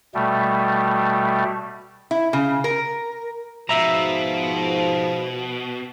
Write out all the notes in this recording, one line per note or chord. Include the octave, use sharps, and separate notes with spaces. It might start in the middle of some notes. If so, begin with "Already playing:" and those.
B2 G3 A3
E4
C#3
A#4
G#2 B2 F3 E5 A#5